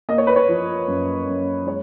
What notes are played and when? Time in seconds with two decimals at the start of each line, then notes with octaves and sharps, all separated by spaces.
0.09 A#3 D#5
0.18 C#5
0.27 B4
0.36 C#5
0.49 F3
0.87 F#2
1.27 F#2
1.67 G#3 C#5